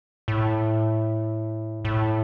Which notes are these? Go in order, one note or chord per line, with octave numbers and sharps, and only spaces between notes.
A2
A2